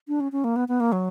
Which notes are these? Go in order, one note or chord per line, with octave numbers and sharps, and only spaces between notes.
D4
C#4
C#4
A#3
B3
B3
A#3
F#3